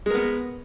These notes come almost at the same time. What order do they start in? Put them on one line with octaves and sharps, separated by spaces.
G#3 A#4 B3